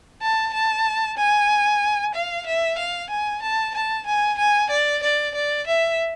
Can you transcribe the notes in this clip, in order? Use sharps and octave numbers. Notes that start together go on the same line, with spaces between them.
A5
A5
G#5
F5
E5
F5
G#5
A5
A5
G#5
G#5
D5
D5
D5
E5